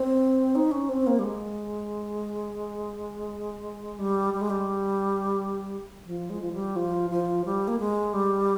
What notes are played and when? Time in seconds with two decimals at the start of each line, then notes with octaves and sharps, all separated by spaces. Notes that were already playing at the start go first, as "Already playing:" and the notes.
Already playing: C4
0.55 D#4
0.71 C#4
0.89 C4
1.07 A#3
1.19 G3
1.24 G#3
3.99 G3
4.34 G3
4.41 G#3
4.50 G3
6.06 F3
6.30 G#3
6.42 F3
6.53 G3
6.76 F3
7.10 F3
7.45 G3
7.68 A#3
7.79 G#3
8.13 G3